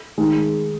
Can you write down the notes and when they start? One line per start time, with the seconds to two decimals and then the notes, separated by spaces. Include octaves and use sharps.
0.18 D#3 G#3